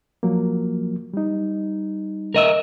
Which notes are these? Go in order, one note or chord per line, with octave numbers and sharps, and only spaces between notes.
F3 F#3 A#3
G3 D#4
A#4 D#5 E5